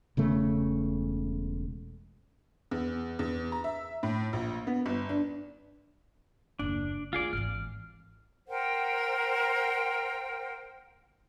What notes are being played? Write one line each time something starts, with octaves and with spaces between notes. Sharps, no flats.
E1 C#3 A3
E2
E2
A#5
E5
A2
A#1
B3
G1
D4
F#1 D#2 D4
D#3 A3 F4 G#4 D5
G#1 E3 F6
A#4 C5 F#5 G5